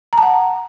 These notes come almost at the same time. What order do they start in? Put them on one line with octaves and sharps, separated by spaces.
A#5 A5 F#5